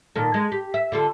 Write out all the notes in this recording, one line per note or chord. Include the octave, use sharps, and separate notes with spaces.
A#2 D#3 A4
G#3
G4
E5
D3 F4 A4